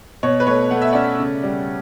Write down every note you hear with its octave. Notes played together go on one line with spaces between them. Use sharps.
B2 C#5
B4
A3 C#5
A3 F#5
E5
C#4 D5 F#5
C#3
G3